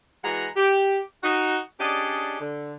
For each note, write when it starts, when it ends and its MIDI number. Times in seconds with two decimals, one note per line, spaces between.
0.24 0.47 52
0.24 0.47 56
0.24 0.47 66
0.24 0.47 78
0.24 0.47 82
0.56 0.99 67
1.23 1.58 63
1.23 1.58 66
1.80 2.37 61
1.80 2.37 62
1.80 2.37 67
1.80 2.37 68
1.80 2.37 74
1.80 2.37 75
2.40 2.75 50